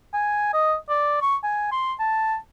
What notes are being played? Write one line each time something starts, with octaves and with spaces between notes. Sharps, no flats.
G#5
D#5
D5
C#6
G#5
C6
A5